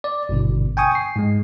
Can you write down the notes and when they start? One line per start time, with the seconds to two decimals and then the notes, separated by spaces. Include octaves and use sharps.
0.04 D5
0.29 G#1 G2 B2 D3
0.77 G5 G#5 C#6 D#6
0.95 C7
1.16 G#2 G#3